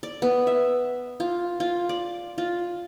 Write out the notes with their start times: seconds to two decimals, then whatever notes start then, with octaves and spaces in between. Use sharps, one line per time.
0.03 D5
0.22 B3
0.47 E5
1.20 F4
1.60 F4
1.89 D5
2.38 F4